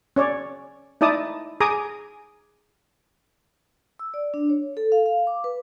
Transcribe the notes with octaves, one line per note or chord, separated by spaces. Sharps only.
C#4 C#5 D5
D#4 E4 D5 A5 D#6
G#4 G#5 A#5 D6 D#6
E6
D5
D4
C#5
A4
F5
F5
D6
B4